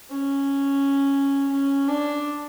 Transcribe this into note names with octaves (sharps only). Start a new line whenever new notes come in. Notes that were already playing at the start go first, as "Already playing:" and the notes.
C#4
C#4
D4